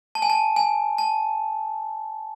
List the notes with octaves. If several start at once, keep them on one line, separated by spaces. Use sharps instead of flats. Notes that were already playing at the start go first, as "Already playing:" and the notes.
A5
G#5
A5
G#5
A5